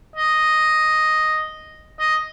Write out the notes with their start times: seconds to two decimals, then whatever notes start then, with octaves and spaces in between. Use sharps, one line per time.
0.16 D#5
2.00 D#5